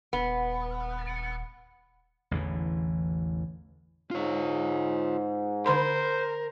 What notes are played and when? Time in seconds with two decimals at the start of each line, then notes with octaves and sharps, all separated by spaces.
0.13 D#1 B3
2.31 A1 E2 D3 E3
4.11 G#2 F4 C#5
5.66 D3 A#4 C5 B5 C6